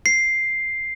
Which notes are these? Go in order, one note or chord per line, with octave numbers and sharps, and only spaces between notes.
C7